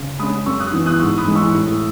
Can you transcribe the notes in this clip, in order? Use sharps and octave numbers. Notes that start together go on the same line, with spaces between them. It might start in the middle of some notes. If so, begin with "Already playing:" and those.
Already playing: C#3
G#3 C#4 B5 D#6
F#2 C#6 E6
D#6 F#6
E3 B3
D#6 F#6
G#2 C#6 E6
B5 D#6
E3 G#3
C#6 E6
A2